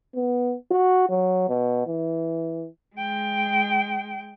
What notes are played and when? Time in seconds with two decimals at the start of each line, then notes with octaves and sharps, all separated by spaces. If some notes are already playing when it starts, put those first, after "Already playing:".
0.15 B3
0.71 F#4
1.09 F#3
1.49 B2
1.86 E3
2.96 G#3 G5